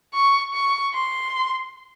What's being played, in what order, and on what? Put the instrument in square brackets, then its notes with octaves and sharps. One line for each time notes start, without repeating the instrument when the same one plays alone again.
[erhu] C#6
C#6
C6